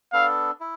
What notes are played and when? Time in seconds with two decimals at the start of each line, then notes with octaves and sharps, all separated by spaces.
0.13 B3 D4 A4 F5
0.60 E4